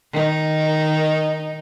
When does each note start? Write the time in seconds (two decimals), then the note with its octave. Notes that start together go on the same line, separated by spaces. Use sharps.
0.12 D#3 D#4